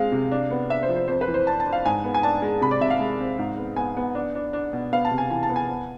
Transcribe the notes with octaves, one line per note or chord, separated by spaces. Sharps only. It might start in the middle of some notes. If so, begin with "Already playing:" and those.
Already playing: G#3 C4 F5
C3
D4
B3
D4 E5
C5
F3
C5
F2 C5
B4
E3
C5
D4 A5
A5
D4
F5
G#2 G#5
B3
G#5
D4 A5
G#3
C3 B5
D5
C3 E5
F5
G#3
C4
G#2
B3
B3 G#5
B3
D4
D4
D4
B2
B3 F5
A5
C3
G#5
E3 G#5
A5
B3
G#5
B3